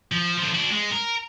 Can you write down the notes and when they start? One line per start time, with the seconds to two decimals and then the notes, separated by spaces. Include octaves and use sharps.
0.12 F3
0.38 D3 F3
0.54 D4 F#4
0.71 G#3
0.91 A#4